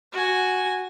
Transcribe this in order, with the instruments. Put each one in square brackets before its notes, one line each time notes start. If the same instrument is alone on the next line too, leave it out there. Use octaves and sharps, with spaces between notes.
[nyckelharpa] F#4 G#5